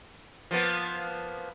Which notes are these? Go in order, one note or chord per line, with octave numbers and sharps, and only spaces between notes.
F3 A#3 B3